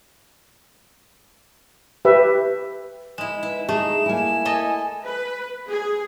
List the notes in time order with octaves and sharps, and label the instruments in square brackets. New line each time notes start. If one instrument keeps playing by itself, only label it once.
[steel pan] G4 B4 E5
[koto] G#3 E4 [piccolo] E7
[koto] E4 [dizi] B4
[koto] A3 [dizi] D#4 [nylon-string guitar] G#4 [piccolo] E7
[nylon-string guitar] A#3 E4 [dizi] G#5
[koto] A4 D#5 E5
[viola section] B4
G#4